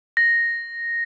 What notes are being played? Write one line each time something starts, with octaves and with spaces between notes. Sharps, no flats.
A#6